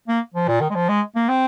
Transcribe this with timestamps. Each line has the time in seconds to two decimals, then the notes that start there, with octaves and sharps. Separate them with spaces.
0.08 A#3
0.34 F3
0.48 A#2
0.61 D#3
0.70 G#3
0.75 F3
0.89 G#3
1.15 A#3
1.29 C4